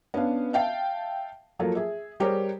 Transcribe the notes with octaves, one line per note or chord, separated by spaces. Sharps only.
B3 C#4 D4 F5
E5 F5 G5 A5
F3 F#3 A#3 A4
G#4 E5
G3 G4 G#4 A#4 C5 C#5